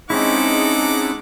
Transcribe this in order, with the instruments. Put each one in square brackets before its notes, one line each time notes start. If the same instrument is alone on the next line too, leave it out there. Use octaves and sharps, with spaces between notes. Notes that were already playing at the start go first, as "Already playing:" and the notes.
[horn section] G#3 [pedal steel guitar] C4 C#4 E4 [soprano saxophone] D#4 [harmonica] A4 F#5 D6